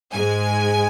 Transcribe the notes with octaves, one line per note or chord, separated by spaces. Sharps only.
G#2 G#3 G#5